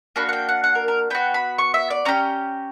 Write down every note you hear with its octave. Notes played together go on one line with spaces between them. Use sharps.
A#3 D4 F#4 B5
F#5
G5
F#5
F#5
A#4
A#4
B3 F#4 G5
B5
C#6
E5
D5
C#4 G4 A#5